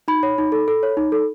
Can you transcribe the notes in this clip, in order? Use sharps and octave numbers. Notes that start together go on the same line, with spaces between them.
D#4 B5
C#5
D#4
A4
A4
C#5
D#4
A4